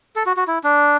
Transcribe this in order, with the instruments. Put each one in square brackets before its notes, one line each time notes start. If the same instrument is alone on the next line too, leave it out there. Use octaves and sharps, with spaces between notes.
[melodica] A4
F#4
F#4
E4
D4